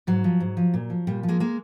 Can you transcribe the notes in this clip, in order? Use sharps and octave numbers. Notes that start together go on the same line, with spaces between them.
G#2 F#3
F3
G#2
F3
A#2
F3
A#2 G3
F3
G#3 A#3
G#3 A#3